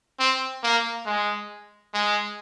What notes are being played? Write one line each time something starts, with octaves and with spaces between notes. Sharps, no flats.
C4
A#3
G#3
G#3